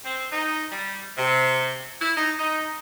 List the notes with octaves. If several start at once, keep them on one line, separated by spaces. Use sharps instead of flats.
C4
D#4
G3
C3
E4
D#4
D#4